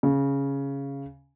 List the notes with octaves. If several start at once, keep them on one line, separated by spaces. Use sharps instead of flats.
C#3